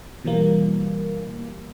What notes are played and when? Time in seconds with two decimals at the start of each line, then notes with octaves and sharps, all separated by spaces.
0.24 B2 E3 G3 A#3